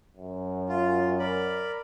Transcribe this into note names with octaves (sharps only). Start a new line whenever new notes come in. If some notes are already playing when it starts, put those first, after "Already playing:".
F#2
F4
A#4 D5 B5